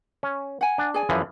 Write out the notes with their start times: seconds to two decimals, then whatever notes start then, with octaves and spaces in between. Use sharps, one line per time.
0.23 C#4
0.61 F#5 G#5
0.78 D4
0.94 G#4 D5 G#5
1.09 F#2 E3 F3